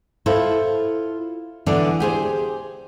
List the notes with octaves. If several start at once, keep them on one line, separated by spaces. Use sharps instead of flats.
E4 F4 A4 C5
D3 E3 B3 D4 D5
G4 G#4 C5